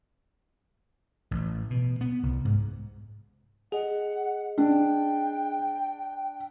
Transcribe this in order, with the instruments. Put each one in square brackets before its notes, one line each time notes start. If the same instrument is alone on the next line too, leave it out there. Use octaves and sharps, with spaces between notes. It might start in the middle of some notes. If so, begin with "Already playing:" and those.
[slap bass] A1
B2
B3
C2
G#2
[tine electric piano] G#4 D#5 [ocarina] F#5
[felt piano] D4 [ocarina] G5